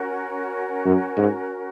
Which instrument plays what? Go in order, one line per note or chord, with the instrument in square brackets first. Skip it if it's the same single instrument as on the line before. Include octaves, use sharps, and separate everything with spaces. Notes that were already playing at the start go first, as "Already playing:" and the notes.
Already playing: [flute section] C#4 F#4 A#4
[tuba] F#2
G#2